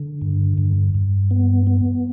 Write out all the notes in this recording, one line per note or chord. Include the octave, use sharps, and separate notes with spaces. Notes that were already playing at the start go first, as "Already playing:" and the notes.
Already playing: D3
G2
G2
G2
B3
B3